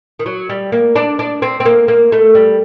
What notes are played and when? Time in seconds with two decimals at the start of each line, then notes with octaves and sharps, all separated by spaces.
0.19 D#3
0.26 F#3
0.49 G3
0.72 A#3
0.96 D4
1.19 D4
1.42 C4
1.60 C4
1.65 A#3
1.88 A#3
2.12 A3
2.35 G3